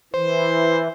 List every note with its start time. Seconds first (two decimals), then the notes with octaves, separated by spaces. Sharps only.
0.14 E3 C5